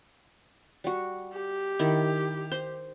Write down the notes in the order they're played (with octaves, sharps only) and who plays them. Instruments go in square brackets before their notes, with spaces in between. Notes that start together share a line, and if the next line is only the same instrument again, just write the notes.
[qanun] G3 F#4
[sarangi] G4
[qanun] D#3 E4
C5